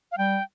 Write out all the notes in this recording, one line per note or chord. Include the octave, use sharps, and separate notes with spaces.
F5
G3 G5